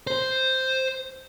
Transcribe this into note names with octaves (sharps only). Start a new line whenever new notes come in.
C5